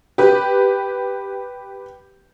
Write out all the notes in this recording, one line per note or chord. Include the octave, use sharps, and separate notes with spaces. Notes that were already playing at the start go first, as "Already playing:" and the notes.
G4 B4